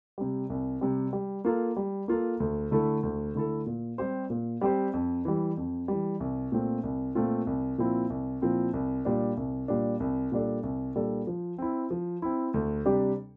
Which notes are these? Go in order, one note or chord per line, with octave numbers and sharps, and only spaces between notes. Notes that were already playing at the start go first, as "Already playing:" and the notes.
C3 G3
C2
C3 G3
G3
A#3 F4 A4
G3
A#3 F4 A4
D2
D3 A3 E4 A4
D2
D3 A3 E4 A4
A#2
G3 C4 G4 C5
A#2
G3 C4 G4 C5
F2
E3 G3
F2
E3 G3
C2
A#2 A3 C4 F4
C2
A#2 A3 C4 F4
C2
A#2 F3 C4 E4
C2
A#2 F3 C4 E4
C2
A#2 G3 D4
C2
A#2 G3 D4
C2
A#2 G3 D4 A4
C2
A#2 G3 D4 A4
F3
C4 E4
F3
C4 E4
D2
C3 G3 D4 G4